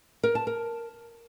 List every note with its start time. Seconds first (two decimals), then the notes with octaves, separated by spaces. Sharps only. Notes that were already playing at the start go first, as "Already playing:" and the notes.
0.23 A#4
0.35 A5
0.47 A#4